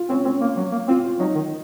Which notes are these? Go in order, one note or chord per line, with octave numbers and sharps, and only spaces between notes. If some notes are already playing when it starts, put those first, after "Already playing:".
Already playing: F4
C4 C#4
C4 C#4
A#3
F#3
A#3
C4 F4
F4
F#3 D#4
D#3